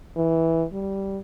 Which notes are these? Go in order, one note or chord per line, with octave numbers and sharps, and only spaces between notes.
E3
G3